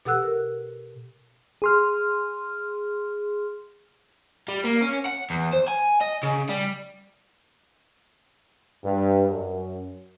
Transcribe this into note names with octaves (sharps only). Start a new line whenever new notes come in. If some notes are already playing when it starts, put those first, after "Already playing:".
B2 G4 A4 F#5 E6 F#6
A#4
G#4 C6 F6
G3
A#3
C#4
F#5
E2
C5
G#5
D#5
C#3
G3
G2
F#2